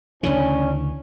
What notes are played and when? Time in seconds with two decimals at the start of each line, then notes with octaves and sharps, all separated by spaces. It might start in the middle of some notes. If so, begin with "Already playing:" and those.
0.23 D2 C#3 E3 C#4 D4